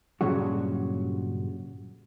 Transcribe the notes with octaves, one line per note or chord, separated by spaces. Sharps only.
G2 A#2 C#3 F#3 G3 F#4